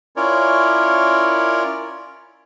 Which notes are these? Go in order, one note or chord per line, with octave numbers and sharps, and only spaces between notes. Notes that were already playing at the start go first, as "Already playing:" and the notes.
C#4 E4 F4 A#4 C#5 D5